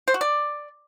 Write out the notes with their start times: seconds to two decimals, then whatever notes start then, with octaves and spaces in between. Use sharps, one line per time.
0.08 C5
0.14 F#4
0.21 D5